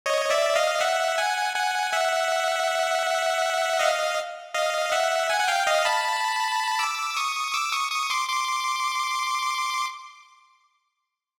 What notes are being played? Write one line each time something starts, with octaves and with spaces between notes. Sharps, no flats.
C#5 D#5
D5 E5
D#5 F5
E5 F#5
F#5 G#5
F#5 G#5
E5 F#5
D#5 F5
D#5 F5
E5 F#5
F#5 G#5
F#5
F5 G5
D#5 F5
A5 B5
D6 E6
C#6 D#6
D6 E6
C#6 D#6
C#6 D#6
C6 D6
C6 D6